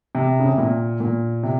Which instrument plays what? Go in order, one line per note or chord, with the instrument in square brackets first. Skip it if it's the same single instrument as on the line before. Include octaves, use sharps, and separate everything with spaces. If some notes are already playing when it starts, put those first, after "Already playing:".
[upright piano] C3
C#3
C3
A#2
A#2
C3